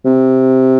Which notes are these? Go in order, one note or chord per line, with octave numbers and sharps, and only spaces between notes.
C3